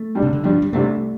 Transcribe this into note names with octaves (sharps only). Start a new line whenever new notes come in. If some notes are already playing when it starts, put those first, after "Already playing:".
Already playing: A3
G2 G3 D4
C3
D3
G2 F3 G3 D4
G3
C2 C3 G3 A3 D4